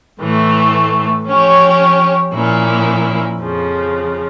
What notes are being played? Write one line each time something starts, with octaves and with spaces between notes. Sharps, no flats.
A2 E3 A3
F3 C#4 G4 C#5
A#2 F3 A#3 C#4 E4
F2 C#3 F3